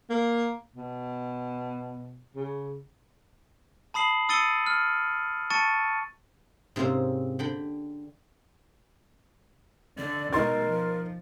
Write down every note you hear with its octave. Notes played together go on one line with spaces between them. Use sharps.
A#3
B2
C#3
A5 B5 D#6 C7 F#7
D#6 E6 A6 C#7 D#7 G7
F6
A5 C#6 A6 C#7 D#7
G#2 C3 A#3 C4 C#4
D3 G5 B5
D3 D5
B2 G#3 D#4 A#4 C6 A6
F3